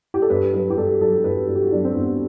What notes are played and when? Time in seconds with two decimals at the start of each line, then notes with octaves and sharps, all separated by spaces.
0.14 G4
0.22 A4
0.30 G2 B4
0.53 F#3 B4
0.70 G4
0.77 G2 A4
1.01 F#3 A4
1.24 G2 B4
1.47 G2 F#4
1.55 G4
1.63 F#4
1.71 F#3 D4
1.84 C4
1.95 G2 B3